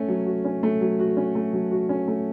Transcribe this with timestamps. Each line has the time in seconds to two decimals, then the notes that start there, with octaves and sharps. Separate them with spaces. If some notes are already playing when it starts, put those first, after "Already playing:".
Already playing: A3 C#4
0.08 F#3
0.26 F#4
0.45 C#4
0.63 A3
0.81 F#3
0.99 F#4
1.17 C#4
1.35 A3
1.53 F#3
1.71 F#4
1.89 C#4
2.08 A3